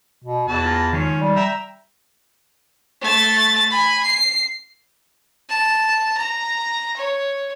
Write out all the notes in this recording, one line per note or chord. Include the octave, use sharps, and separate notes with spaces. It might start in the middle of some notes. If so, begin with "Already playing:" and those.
B2
E2 E3 A5
F4 A#5
C#2 D#3 F3 C#4
G3
E5 G5 A#5
A3 A6
G#5 B5
C7
A5
A#5
C#5